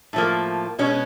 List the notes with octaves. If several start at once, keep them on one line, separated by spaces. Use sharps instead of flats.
A2 F3 A#3
B2 G#3 C#4